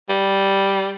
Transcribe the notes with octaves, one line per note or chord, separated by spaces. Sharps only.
G3